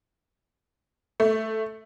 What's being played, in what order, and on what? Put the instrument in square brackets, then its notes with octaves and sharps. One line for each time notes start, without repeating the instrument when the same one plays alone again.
[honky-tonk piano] A3